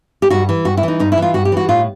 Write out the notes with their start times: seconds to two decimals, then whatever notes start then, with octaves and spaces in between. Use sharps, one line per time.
0.22 G4
0.30 G2 F#4
0.49 E3
0.65 G2 F#4
0.77 E4
0.83 E3 D#4
1.00 G2 D#4
1.12 E4
1.18 E3 F4
1.34 G2 F#4
1.45 G4
1.52 E3 F#4
1.69 A2 F4